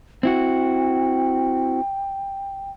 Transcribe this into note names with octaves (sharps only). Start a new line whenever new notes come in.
C4 E4 F#4 G5